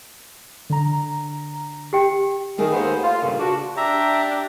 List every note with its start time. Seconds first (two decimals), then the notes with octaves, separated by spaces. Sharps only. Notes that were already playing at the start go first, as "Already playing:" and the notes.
0.70 D3 A#5
1.93 G4 G5
2.58 D#3 A3 G#4
2.72 D#2 B3 C5
3.02 F4
3.20 G2 A#2 C#3
3.38 D4 F#4
3.77 D4 G4 E5 A#5